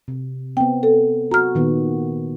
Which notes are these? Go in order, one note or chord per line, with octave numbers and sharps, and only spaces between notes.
C3
B3 C4 G5
A4
F#4 A#5 F6
A#2 D#3 B3